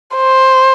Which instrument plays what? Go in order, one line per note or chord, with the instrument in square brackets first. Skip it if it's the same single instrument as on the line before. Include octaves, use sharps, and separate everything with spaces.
[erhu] C5